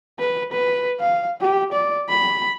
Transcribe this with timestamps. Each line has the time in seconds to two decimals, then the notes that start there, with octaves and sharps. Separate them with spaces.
0.19 B4
0.52 B4
1.00 F5
1.41 G4
1.72 D5
2.09 B5